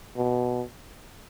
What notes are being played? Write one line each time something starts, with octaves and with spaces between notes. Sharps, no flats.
B2